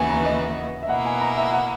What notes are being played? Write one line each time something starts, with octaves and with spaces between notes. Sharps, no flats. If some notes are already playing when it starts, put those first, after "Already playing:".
Already playing: D#2 C#3 E3 B3 F#4 G#5 C#6
A#5
D#5
E5
B2 A#3 E4 F#5
G#5
A#5
E5
F#5